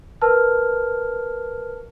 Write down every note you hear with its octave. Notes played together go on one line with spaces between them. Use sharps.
A#4 B4 A5 F6